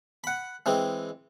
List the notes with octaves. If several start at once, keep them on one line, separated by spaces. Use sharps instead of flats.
F#5 B5
E3 G#3 C4